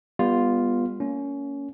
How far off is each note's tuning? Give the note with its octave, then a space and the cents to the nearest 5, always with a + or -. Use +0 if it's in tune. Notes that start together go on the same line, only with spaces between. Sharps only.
G3 +40 B3 -10 F4 +0
A#3 -10 C#4 +20